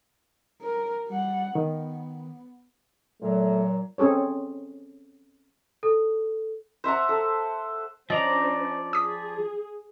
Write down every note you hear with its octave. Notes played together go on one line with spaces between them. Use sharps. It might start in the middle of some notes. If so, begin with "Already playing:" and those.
A#4
G3 F#5
D#3 B3
A#2 F#3 A3
C4 C#4 G#4 A4 C#5
A4
C5 E5 F#5 A#5
A4
F3 C#4 D4 C5 D5 D#5 A#5
G#4 D#6 B6